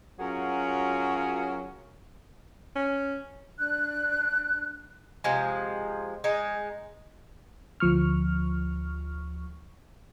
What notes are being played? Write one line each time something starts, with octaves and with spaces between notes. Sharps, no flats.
F#3 C#4 F4 F#4 G#4 A#4
C#4
D4 F#6
C3 F3 G#3
G#3 D#4
D2 F3 C#6 F6